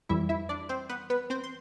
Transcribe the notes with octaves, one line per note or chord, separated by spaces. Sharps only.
F2 E3 G3 E4 E5
E4 E5
D4 D5
C4 C5
B3 B4
B3 B4
C4 C5
C6